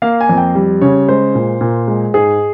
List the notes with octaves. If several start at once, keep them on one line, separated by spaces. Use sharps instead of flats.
A#3 F5
G#5
F2
G5
G3
C#3 C#5
G#3 C5
A#2
A#2
G#3
G#2 G#4